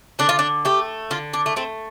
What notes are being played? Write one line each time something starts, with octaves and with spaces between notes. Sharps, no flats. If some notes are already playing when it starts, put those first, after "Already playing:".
D3 D4
F4
D4
A3 G4
D3 F4
D4
A3
A3 C4